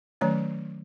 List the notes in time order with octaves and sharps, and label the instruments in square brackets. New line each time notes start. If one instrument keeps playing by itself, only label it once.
[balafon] D#3 F#3 A3 C#4 C#5